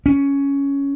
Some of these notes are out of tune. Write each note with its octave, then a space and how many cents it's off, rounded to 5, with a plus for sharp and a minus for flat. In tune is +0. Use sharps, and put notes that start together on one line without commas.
C#4 +10